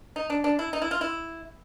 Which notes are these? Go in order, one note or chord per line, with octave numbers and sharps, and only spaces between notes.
D#4
D4
D4
E4
D#4
E4
F4
E4